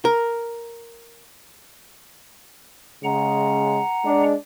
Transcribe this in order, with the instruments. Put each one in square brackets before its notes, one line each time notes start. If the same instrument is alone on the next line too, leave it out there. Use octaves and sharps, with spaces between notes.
[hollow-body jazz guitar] A#4
[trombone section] C#3 G#3 [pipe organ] F#5 A#5
[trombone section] G#3 D4